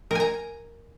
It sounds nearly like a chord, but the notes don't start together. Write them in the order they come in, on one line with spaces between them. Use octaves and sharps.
A#4 G#5 A#5